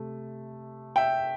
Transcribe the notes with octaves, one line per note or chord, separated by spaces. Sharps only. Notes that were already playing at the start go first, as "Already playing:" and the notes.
Already playing: C3 A3
E5 G5